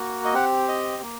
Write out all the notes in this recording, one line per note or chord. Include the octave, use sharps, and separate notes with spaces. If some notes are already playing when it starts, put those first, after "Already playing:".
Already playing: A#3 F#4
D#5
C4 G4 F#5
D#5
A#3